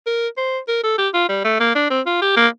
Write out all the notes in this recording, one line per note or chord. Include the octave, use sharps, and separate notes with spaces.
A#4
C5
A#4
A4
G4
F4
G3
A3
A#3
D4
C4
F4
G4
A#3